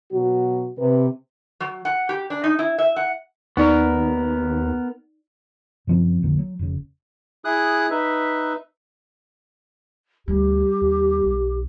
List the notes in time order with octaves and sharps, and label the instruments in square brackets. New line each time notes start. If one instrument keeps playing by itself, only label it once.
[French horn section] B2 F#3 F#4
C3 B4
[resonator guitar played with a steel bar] F#3
F#5
G4
D4
D#4
E4
E5
F#5
[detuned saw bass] D#2 [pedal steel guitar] B3 A#4 [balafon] D#4 D5
[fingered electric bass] F#2 C#3 F3 C4
A#1 F2 D3 A#3
F#3
F1 C#3
[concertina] E4 G#4 D#6 F#6
D#4 B4 E5
[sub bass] D2 [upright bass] G3 [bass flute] G4
[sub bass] D#2
B1